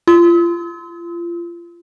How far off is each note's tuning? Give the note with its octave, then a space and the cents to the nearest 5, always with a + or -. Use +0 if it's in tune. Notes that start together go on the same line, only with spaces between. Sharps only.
F4 -30 E6 -45